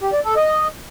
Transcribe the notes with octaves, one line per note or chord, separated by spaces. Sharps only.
G4
D5
A4
D#5